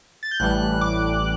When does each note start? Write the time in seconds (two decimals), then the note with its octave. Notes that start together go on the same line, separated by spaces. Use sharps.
0.23 A6
0.31 G6
0.40 A1 A2 E3 G3 F#6
0.81 D6